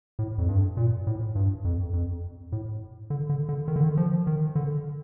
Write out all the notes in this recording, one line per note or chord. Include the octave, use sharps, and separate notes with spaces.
A2
F2
G2
A#2
A2
G2
F2
F2
A2
D3
D3
D3
D#3
D3
D#3
F3
D#3
D3